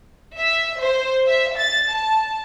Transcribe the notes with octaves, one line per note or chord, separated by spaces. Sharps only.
E5
C5
E5
A6
A5